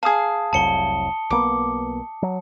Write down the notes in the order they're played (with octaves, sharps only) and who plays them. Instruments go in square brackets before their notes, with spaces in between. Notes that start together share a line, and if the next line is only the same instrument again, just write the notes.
[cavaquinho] G#4 F5 [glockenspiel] A5 D#6
[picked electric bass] F1 C2 F#3 [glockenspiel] A5 C#7 G7
[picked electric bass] B1 A#3 B3 [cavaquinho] D6
[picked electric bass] F#3